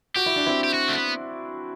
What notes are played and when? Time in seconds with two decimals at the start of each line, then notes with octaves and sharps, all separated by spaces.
0.16 F#4 G4
0.26 E4
0.36 D4
0.46 C4 E4
0.64 G4
0.74 F#4
0.89 A3
0.92 B3